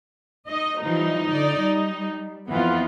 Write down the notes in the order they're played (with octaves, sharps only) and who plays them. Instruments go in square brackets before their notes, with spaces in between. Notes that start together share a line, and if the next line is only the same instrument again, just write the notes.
[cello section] D#4 [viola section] D#5
[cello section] E3 F3 G3 [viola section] D#4
[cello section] D3 D5
G3
[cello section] F2 E3 [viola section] B3 F4